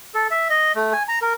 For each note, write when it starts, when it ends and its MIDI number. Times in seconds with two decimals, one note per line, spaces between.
0.14 0.27 69
0.31 0.48 76
0.50 0.72 75
0.75 0.93 57
0.93 1.03 80
1.08 1.19 82
1.22 1.33 70